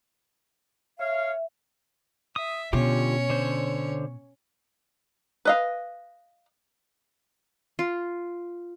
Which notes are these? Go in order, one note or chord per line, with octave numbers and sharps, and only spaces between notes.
C#5 E5 F5
E5 D#6
B2 D3 C#4 F4 G4 C#5
D3 C5
B4 D#5 F5
F4